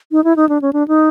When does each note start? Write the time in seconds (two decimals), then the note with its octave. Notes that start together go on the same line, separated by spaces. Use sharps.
0.12 D#4
0.24 E4
0.36 D#4
0.49 D4
0.62 C#4
0.73 D4
0.88 D#4